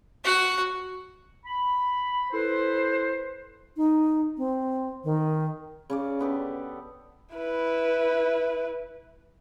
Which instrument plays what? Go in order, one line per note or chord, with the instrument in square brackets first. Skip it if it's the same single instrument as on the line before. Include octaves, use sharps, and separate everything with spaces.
[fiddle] F#4 F#5
[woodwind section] B5
E4 A4 B4 C5
[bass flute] D#4
C4
D#3
[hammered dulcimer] C#3 C#4 D5
D3 B3 G4 A4
[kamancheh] E4 B4